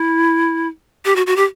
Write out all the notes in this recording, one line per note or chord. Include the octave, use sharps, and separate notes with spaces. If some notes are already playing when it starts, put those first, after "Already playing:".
Already playing: E4
G4
F#4
F#4
G4